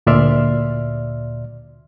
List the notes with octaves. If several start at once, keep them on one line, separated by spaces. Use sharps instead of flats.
D2 A#2 D5 E5 C6 F6